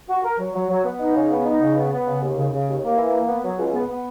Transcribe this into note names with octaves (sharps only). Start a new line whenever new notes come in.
F#4
A#4
F#3
F#3
F#3
B3
D#4
C#3
B3
D#4
C#3
B3
B3
C#3
D#2
C#3
C#3
D#2
A#3
E3
A#3
B3
F#3
C#2
B3
B3